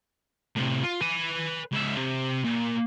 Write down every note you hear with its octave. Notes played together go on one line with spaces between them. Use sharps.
A2 C3
F4
B4 G#5
C#2 E5
C3
A#2